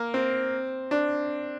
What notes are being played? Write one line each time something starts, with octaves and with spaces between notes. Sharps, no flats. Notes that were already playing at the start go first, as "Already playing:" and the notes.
Already playing: A#3
C4
D4